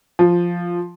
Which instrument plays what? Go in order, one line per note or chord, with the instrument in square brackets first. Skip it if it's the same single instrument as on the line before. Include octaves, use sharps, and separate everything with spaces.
[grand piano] F3